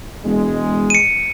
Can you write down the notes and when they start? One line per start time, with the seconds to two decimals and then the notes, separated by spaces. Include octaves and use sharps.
0.25 E1 G#3
0.90 C#7 D#7